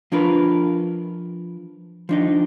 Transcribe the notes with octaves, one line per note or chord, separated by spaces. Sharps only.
F3 D4 F4 A#4 B4
F3 D4 D#4